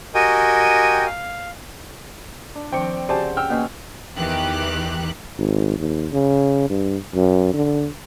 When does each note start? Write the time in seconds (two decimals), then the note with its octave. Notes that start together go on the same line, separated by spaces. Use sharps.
0.14 F#4 G4 A#4 D#5 G5 G#5
1.06 F5
2.55 D4
2.72 D#3 F3 C4 D5 G5 C#6 D6 C#7
3.09 C#3 C4 F#4 G4 C5 D5 G#5 A5
3.37 G5 E6 F6
3.50 B2 A#3 C#4 D#5 C6
4.17 E2 D#3 E3 G4 F#6
5.38 G#1
5.79 D#2
6.12 C#3
6.70 G2
7.14 F#2
7.53 D3